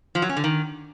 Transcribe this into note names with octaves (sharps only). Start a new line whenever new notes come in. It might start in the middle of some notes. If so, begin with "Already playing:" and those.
F3
F#3
C#4
D3
D#3